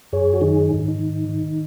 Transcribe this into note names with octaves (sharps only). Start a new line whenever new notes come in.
F#2 G#4 C#5
F#4
D#3 D#4 G#4
G#2 D#4
D#4
D#3
D#3